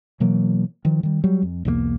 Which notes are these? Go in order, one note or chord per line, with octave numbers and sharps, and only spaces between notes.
B2 E3 F#3 A#3
D#3 F3
D#3 G3
F#3 G3
F2
B1 E2 F#3 A#3